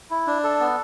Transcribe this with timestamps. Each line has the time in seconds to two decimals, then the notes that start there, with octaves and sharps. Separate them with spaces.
0.10 E4
0.27 D4
0.44 A4
0.60 B3